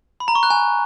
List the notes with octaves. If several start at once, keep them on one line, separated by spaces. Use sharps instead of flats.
B5
A#5
C#6
F#6
G#5